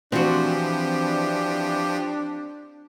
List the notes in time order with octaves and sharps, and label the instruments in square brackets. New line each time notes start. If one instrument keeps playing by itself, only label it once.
[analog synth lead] E3 [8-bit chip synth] F3 G4 [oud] C4 F#4 [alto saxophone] D4